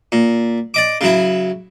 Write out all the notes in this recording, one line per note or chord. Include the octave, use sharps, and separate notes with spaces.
A#2
D5 D#5 D6
C#3 F#3 E4